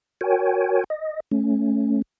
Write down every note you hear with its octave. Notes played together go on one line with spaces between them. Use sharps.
F#4 A#4 C#5 G5 G#5
D#5
A3 C#4